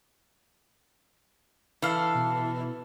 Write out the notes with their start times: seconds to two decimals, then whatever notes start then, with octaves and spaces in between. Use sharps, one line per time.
1.82 E3 A4 F5
2.14 B2